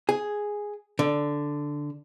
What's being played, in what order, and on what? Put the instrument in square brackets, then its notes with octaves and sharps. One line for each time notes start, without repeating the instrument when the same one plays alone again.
[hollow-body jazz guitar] G#4
D3